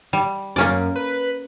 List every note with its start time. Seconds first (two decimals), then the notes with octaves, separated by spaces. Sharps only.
0.13 G3
0.56 F#2 A#3 C#4 D5
0.96 B4